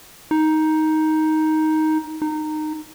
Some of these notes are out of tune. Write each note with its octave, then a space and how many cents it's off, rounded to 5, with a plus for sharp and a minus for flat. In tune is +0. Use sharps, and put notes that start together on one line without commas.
D#4 +10
D#4 -15